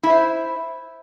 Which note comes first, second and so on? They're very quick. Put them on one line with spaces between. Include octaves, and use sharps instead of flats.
E4 E5 C5